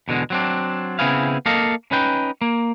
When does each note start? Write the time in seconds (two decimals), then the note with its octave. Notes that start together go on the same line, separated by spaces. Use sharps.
0.08 E2 B2 D3 G#3
0.30 F#3 C4 D4
0.99 C#3 B3 C4 E4 G#4 F5
1.46 A#3 A4 D#5 F5
1.91 C#4 D#4 B4 G5
2.41 A#3